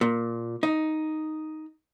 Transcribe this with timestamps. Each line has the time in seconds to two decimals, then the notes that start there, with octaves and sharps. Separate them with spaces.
0.01 A#2
0.63 D#4